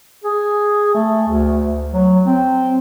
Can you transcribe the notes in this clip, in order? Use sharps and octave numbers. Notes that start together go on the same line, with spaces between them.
G#4
A3
D2
F#3
C4